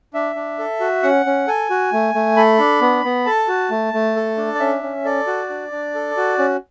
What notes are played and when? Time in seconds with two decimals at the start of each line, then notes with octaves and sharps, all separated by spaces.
0.14 D4 E5
0.36 D4
0.59 A4
0.80 F#4
1.03 C#4 F#5
1.26 C#4
1.47 A4 G#5
1.70 F#4
1.93 A3
2.15 A3
2.36 A4 B5
2.59 D4
2.81 B3
3.05 B3
3.26 A4 A5
3.48 F#4
3.71 A3
3.94 A3
4.16 A4
4.37 D4
4.55 D5
4.60 C#4 E5
4.83 C#4
5.05 A4 D5
5.27 F#4
5.49 D4
5.72 D4
5.95 A4
6.17 F#4
6.39 C#4